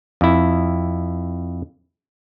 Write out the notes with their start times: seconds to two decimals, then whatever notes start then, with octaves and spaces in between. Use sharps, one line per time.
0.21 F2 E4